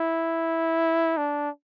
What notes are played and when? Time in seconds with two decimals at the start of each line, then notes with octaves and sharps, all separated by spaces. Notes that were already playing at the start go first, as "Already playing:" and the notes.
Already playing: E4
1.17 D4